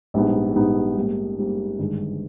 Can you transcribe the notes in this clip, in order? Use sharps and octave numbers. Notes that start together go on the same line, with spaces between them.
A#1 G#2 G3 B3 D#4
A#1 G#2 G3 B3 D#4
G#2 G3 A#3
G#2 G3 A#3
G1 G2 D#3 G#3